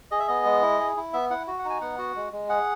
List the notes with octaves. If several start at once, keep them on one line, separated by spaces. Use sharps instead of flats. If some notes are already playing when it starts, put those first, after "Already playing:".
G#4 D#5
E5
B3 D#5
G#3
E4
G#4
E4
B3 E5
E4 F#5
F#4
F#5
D#4 G#5
B3 F#5
F#4
G#3
G#3
G#4 F#5